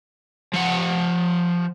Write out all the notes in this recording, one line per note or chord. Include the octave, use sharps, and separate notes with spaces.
F3 F#5